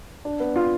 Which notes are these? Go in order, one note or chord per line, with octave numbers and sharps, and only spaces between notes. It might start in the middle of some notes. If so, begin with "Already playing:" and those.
D4
B3
F4